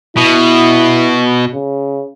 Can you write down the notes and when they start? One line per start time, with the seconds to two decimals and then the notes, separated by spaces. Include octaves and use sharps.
0.17 B2 E4
1.54 C#3